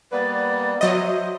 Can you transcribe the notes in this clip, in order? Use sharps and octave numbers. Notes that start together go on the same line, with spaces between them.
G3 A#3 B3 B4 D5
F#3 C5 D#5 E5